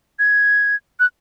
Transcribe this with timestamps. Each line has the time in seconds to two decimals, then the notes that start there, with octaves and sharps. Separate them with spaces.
0.19 G#6
1.00 F#6